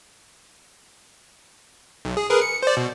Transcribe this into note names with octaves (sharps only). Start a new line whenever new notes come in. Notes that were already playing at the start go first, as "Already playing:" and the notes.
B1
G#4
G#4 A#4 B4
C#7
C5 D5
B2